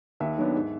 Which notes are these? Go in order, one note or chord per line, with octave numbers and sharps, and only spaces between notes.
D#2 E5
D#3 F#3 B3 D4
G#2